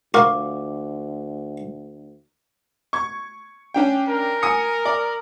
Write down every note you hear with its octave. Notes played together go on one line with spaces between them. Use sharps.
D2 F3 F#4 A#4 F5 D6
C#6 G#6
C#4 D4 G5
A#4
G#5 D#6 C#7
D5